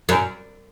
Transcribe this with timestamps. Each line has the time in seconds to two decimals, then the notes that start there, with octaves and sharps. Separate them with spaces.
0.09 F#2